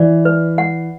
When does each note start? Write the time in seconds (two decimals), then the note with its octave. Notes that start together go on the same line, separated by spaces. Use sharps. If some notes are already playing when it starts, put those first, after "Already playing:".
Already playing: E3 D5
0.25 B4
0.58 F#5